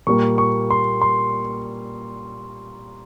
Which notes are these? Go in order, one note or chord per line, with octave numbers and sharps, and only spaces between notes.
A#2 G3 A#3 C#6
C#6
C6
C6